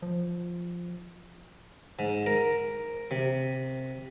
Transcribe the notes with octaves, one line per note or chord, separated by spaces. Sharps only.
F3
G#2
A#4
C3